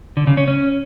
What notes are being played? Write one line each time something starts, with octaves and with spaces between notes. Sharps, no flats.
D3
C#3
C#4
C#4